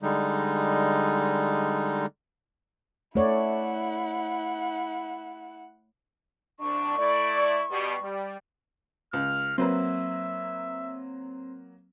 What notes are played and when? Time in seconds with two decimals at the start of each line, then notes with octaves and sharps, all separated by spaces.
0.02 D3 G3 G#3 D#4
3.15 A3 E4 C#5 D5 F#5
6.60 C2 D4 C#6
6.98 A3 E4 D5
7.70 B2 G3
8.02 G3
9.13 C#2 F6
9.58 F#3 A#3 C4 B4 E5